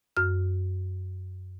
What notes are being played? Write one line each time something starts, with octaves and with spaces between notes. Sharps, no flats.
F#2 F6